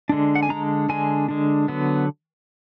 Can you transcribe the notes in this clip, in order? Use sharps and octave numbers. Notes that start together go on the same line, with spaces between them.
D3 G#3 D4
F#5
G#5
D3 G#3 D4 A#5
D3 G#3 D4 G#5
D3 G#3 D4
D3 F#3 B3